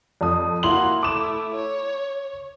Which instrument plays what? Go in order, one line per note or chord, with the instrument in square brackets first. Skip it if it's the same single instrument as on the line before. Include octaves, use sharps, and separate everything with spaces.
[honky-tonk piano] F2 A4 D#6
[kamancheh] A#3 F#4 [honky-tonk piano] E4 C6 F#7
[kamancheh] A3 E4 [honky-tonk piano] D6 E7
[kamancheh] C#5